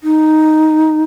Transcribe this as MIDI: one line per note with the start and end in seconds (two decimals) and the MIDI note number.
0.03 1.03 63